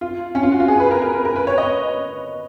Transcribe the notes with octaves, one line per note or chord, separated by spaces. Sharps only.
F4
C#4
F4
F#4
F4
G#4
B4
A#4
A#4
B4
A#4
B4
C#5
D#5